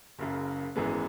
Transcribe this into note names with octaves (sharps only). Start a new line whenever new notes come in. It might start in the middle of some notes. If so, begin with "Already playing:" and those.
F#1 F#2 C#3
G#1 F#2 E3 G#3 B3